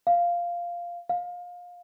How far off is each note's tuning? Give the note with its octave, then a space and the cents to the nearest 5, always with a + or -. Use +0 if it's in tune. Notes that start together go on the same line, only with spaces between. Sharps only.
F5 -5
F5 +25